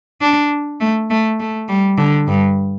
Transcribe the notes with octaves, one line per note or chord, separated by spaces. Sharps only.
D4
A3
A3
A3
G3
D3
G2